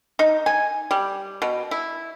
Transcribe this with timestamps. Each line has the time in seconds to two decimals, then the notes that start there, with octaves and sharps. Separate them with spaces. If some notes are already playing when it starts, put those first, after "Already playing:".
0.19 D#4
0.46 G#5
0.91 G3
1.42 B2
1.71 E4